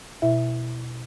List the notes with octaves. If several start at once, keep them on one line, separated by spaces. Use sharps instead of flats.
B2 E4 E5